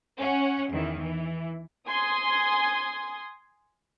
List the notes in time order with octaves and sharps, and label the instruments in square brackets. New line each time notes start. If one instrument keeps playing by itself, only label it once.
[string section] C#4 F#5
E2 D#3 E3
E3
[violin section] G#5 C6 D#6